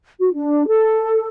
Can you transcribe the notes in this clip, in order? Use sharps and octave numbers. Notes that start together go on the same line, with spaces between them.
F#4
D4
A4